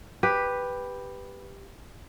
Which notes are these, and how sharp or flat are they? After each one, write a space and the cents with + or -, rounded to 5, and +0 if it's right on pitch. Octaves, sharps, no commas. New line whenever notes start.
G4 +10 B4 +0